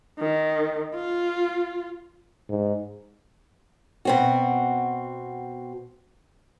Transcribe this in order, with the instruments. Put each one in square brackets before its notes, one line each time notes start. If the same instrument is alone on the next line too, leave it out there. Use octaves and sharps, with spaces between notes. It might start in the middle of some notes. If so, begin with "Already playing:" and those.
[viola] D#3
F4
[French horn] G#2
[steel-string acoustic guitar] B2 C4 F#4